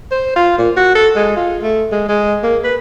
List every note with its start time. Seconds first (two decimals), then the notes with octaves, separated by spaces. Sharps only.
0.11 C5
0.36 F4
0.58 A#2
0.76 F#4
0.95 A4
1.16 G#3
1.36 F4
1.63 A3
1.92 G#3
2.09 G#3
2.43 A#3
2.64 B4